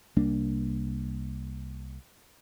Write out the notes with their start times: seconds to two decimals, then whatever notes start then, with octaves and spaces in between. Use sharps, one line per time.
0.16 C2 G3 A#3 D4